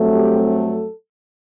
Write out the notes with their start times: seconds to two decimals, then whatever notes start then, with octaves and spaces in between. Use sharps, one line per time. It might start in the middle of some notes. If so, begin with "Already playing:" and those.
Already playing: G2 F#3 A3 C4
0.14 G4
0.47 A4